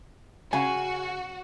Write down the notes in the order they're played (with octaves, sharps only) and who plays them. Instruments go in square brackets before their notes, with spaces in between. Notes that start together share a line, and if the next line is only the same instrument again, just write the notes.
[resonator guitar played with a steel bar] C#3 [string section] F#4 [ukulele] G#5